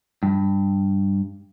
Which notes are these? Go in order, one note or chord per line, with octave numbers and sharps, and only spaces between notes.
G2